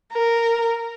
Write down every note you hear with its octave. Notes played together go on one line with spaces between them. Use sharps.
A#4